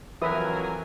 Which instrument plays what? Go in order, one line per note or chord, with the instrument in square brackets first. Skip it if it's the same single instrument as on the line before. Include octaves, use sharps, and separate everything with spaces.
[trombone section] F2 F#3 [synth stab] E3 [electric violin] A#4 G#5 [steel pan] B4 E5 D#6